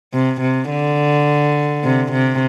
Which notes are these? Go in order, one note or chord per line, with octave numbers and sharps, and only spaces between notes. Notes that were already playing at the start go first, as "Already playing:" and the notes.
C3
C3
D3
C3
C3